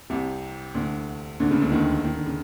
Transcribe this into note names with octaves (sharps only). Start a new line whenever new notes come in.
C2 C3
D2 D3
D2 D3
C#2 C#3
D2 D3
D#2 D#3
D#3
D3
C#3